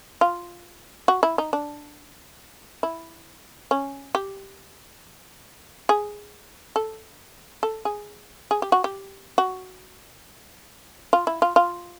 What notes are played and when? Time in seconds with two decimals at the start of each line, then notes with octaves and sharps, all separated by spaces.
0.21 F4
1.08 F#4
1.23 E4
1.38 D#4
1.53 D4
2.83 E4
3.71 C#4
4.15 G4
5.89 G#4
6.76 A4
7.63 A4
7.85 G#4
8.51 G#4
8.62 G4
8.72 F#4
8.84 G4
9.38 F#4
11.13 F4
11.27 E4
11.42 F4
11.56 F4